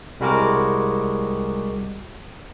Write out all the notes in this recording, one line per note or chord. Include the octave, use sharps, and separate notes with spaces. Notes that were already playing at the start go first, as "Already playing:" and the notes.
C2 G3 G#3 F#4 A#4 D6